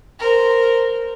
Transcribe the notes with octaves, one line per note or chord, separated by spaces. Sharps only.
A#4 C5